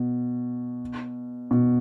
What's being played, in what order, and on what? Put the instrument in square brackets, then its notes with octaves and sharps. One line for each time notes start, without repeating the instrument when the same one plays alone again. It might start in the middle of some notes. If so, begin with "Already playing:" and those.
Already playing: [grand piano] B2
B2